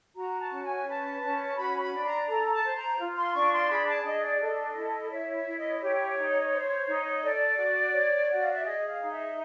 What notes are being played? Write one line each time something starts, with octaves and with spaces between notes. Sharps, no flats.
F#4 A#5
A5
C#4
G#5
B4 A5
C#4
F#4 B5
B5
D4
A#5
A4 A#5
A5
C5
A#5
F4
C6
D4 C#6
C6
G#4 B5
A5
D4 D#5
D5
A4 D#5
E4
C#5 E5
E5
E4
D#5
G4 C#5
D#4
C5
D#4
A4 D5
F#4
C#5
F#4
F5
E5
G#4 D#5
F5
D#4
E5